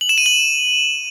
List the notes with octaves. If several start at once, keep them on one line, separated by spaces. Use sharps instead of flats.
F#7
E7
D#7
F#7